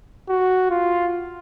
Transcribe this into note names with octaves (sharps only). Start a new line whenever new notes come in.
F#4
F4